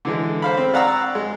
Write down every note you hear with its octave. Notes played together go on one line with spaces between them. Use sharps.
D3 E3 G#3
C5 F5 B5
C4
D5 F5 F#5 A#5 C#6 E6
G#3